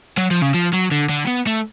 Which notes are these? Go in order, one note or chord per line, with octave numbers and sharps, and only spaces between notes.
F#3
F3
C#3
F3
F#3
D3
D3
B3
A3